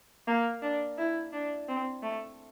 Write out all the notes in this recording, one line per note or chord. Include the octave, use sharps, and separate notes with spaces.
A#3
D4
E4
D4
C4
A3